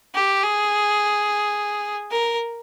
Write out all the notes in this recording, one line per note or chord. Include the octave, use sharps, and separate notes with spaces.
G4
G#4
A#4